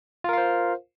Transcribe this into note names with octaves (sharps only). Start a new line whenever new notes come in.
F4 A#4 C5 F5